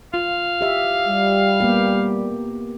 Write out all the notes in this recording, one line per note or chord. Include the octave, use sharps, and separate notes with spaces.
F4 F5
G4 E5
G3
A#3 B3 G4